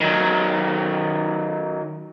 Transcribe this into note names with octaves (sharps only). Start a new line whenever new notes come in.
D#3 F#3